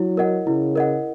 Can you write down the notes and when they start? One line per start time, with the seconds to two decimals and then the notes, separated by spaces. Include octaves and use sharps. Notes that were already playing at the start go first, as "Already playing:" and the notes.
Already playing: F#3 E4
0.17 A#4 D#5 F#5
0.46 C#3 E4
0.76 A#4 D#5 F#5